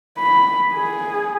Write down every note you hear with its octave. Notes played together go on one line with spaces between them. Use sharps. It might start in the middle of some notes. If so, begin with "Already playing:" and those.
B5
G#4